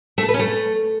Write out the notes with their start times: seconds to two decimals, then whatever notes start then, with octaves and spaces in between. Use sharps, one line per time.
0.18 A3
0.23 A4
0.29 B4
0.34 C#4
0.39 A3